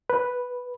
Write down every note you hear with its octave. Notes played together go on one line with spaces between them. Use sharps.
B4